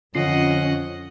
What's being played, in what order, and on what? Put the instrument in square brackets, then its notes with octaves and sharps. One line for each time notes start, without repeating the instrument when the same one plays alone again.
[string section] F2 [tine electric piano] D3 F4 C7 [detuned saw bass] C#4 [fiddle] D#5 F#5